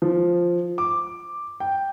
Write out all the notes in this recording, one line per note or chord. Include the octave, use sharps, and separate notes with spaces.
F3
D6
G5